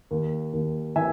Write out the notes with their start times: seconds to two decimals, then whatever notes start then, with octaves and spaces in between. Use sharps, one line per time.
0.11 D#2
0.53 D#2
0.96 E3 E5 G#5